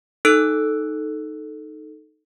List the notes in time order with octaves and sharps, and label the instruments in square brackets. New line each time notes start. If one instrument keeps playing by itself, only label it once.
[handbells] D#4 A4 E6 F#6 D7